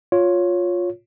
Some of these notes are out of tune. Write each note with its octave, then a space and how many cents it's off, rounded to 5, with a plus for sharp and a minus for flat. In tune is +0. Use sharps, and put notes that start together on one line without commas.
F4 +15 C#5 +0